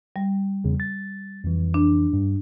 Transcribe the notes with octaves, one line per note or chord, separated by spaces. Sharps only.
G3
E2 C#3
A6
F2 E3
D4
G2